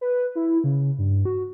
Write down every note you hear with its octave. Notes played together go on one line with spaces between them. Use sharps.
B4
E4
C#3
G2
F#4